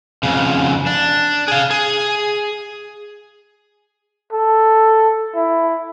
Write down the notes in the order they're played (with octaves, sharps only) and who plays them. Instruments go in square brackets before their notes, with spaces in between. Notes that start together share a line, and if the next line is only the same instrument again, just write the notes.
[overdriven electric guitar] F2 C#3
D4
G#4 F5
G#4
[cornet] A4
E4